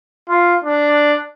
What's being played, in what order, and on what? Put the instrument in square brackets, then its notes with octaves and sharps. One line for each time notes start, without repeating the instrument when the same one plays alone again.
[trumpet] F4
D4